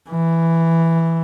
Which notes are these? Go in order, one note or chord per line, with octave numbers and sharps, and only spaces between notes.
E3